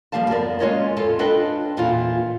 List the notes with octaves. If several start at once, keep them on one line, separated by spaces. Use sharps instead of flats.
F3 G3 A#3 F5 A5
F#2 B3 A#4 D5
G#3 A#3 C#4 F4 C#5 D#5
E2 F4 A4 C#5 A5
D4 F4 A4 B4 D#5 G5
E2 A#2 E3 C4 F4